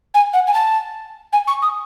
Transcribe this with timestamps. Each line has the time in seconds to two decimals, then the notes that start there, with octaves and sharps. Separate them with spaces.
0.14 G#5
0.33 F#5
0.47 G#5
0.54 A5
1.33 G#5
1.47 C#6
1.62 D#6